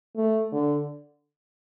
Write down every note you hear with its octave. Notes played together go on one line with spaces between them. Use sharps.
A3
D3